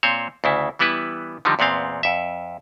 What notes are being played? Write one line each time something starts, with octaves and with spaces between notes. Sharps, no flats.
A#2 C4 C5 C#5
D2 C#3 E4
E3 G3 B3 E4 B4
D3 D#3 F3 G3 D#4
E2 A#2 B3 C4 F5
F2 E5